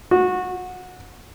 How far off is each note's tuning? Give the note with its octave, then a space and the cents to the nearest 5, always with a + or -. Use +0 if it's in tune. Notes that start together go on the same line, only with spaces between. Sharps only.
F#4 -20